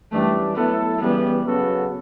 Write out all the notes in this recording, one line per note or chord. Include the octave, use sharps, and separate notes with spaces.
F#2 E3 G3 A3 D4
F#3 A3 B3 E4 A4
C#3 E3 G3 B3
C#3 F#3 B3 F#4 A4